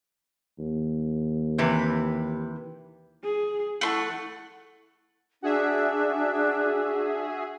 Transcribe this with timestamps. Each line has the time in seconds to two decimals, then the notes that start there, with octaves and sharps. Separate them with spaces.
0.59 D#2
1.58 C3 E3 B4
3.24 G#4
3.81 A3 E4 F#5 C6 C#6
5.42 D4 F#4 G#4 E5